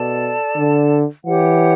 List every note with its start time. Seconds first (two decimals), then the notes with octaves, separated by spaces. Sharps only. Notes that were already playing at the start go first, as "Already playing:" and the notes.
Already playing: B2 A4 D5 A5
0.56 D3
1.26 E3 G4 C#5 F#5